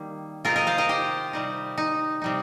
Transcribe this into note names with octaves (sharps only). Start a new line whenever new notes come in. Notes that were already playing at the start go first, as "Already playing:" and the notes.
Already playing: D#3 G3 A#3
C3 D#3 C4 D#4 F4 A#4
A#4 D#5
C5 F5
A#4 D#5
G4 C5
C3 G3 D#4
D#4
C3 G3 D#4